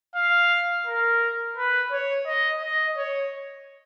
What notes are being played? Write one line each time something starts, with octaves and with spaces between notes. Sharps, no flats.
F5
A#4
B4
C#5
D#5
D#5
C#5